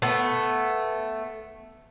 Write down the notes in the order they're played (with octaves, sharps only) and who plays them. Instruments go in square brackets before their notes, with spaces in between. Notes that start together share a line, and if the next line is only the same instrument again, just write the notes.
[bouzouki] A3 B3